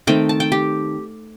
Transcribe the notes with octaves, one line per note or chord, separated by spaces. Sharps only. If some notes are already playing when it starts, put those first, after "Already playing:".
D#3 A3 C4 G5
A5
G5
G4